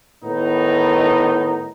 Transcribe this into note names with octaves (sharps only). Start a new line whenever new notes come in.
A2 D#3 B3 D#4